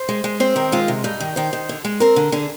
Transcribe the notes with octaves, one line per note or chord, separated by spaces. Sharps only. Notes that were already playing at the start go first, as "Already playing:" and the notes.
Already playing: C5
G#3
G#3
C4 C5
D#3 A#4
G#3 F4
C3
G2 D#4
D#3
D#3 C5
D#3
D3
G#3
C4 A#4
D3
D3 G#4